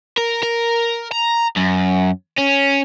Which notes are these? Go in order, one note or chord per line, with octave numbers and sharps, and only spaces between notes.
A#4
A#4
A#5
F#2
C#4